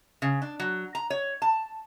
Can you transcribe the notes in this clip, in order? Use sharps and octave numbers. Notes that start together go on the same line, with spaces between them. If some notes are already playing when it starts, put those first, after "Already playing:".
C#3
D4
F#3
A#5
C#5
A5